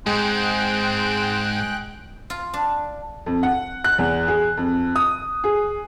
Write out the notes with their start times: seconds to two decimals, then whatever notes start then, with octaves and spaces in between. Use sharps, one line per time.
0.06 G#2 G#3 C4 G5 F#6
2.30 F4
2.54 D4
3.26 F2
3.43 F#5
3.84 F#6
3.98 E2
4.28 G#4
4.57 F2
4.96 D#6
5.44 G#4